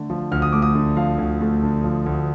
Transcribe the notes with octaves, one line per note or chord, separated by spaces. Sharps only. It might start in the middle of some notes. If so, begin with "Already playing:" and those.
Already playing: D3 A3
F3
D2 F6
D#6
A3 D6
D#6
D3
F3 F5
D2
A3
D3
F3
D2